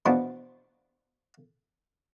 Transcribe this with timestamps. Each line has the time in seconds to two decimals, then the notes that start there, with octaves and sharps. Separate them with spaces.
0.06 E2 B2 E3 F3 B3 D4